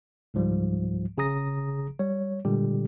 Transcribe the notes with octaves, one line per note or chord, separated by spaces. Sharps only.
C#2 G#2 F3 G3
G1 C#3 G#4 A#5 D#6 A#6
G3 C#5
A#2 D3 G3 G#3 G4